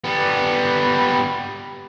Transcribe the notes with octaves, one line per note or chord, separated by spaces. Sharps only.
G3 B3